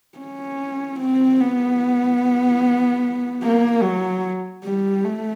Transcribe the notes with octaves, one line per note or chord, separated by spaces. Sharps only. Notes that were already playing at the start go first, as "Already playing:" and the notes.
C#4
C4
B3
A#3
F#3
G3
A3